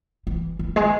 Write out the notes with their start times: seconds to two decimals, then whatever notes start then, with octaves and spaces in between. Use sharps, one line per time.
0.27 E3
0.59 D#3
0.76 G#3